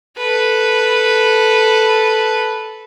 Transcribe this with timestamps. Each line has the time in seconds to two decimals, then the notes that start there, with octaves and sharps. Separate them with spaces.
0.17 A4 B4